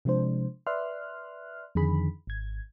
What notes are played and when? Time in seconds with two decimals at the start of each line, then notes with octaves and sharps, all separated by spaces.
0.05 C3 F3 G#3 D4 C5
0.67 B4 D5 E5 C6 F6 F#6
1.75 F2 D3 D#3 G#4 B5
2.27 G#1 G#6